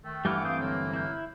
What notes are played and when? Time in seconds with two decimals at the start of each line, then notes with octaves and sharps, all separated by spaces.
0.04 D#3 A3
0.25 G2 E3 G3 A3 F#5 G5 D6 F6
0.44 C4 C5 F5 D6 D#6 G6
0.59 D3 F#3 A#3
0.93 E4 G6